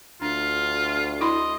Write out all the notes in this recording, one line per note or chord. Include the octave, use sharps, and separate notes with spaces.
D2 D4 F4
E4 D#5 B5 C6